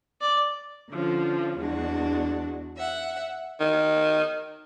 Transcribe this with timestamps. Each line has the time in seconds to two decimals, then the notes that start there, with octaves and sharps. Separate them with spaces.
0.21 D5
0.90 D3 F3 C#4
1.58 E2 G#3 D4 F#4
2.77 E5 F#5
3.60 D#3